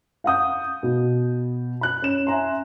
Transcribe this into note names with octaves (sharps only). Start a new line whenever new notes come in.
F5 F#5 D#6 G6
B2
B5 F#6
C#4 E7
E5 G#5 A#5 C6